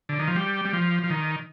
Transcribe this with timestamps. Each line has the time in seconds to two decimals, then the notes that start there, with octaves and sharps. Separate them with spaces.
0.09 D3
0.19 D#3
0.27 F3
0.36 G3
0.65 G3
0.73 F3
1.04 F3
1.10 D#3